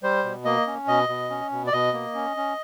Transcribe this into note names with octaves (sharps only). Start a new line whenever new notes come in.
G3 C5
B2
A#3 D#5
C#4
B2 D#5
B2
C#4
B2
D5
B2 D#5
A#3
C#4
C#4